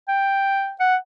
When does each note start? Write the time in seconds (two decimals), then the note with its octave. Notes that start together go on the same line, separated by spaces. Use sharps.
0.08 G5
0.80 F#5